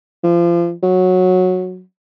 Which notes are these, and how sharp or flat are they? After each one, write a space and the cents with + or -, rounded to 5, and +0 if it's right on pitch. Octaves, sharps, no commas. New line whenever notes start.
F3 -30
F#3 -10